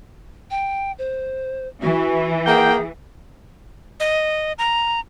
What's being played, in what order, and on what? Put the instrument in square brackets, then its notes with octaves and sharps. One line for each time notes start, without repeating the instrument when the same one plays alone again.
[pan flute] G5
C5
[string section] E3 [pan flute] F#4
[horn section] A#3 F#5 G5 [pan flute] G#4
[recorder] D#5
A#5